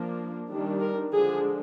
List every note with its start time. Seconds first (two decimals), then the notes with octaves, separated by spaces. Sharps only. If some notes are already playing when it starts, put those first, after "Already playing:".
Already playing: F3 A#3 D4
0.49 D#3 G3 D4
0.81 A#4
1.12 D3 F3 G#3 D4 G#4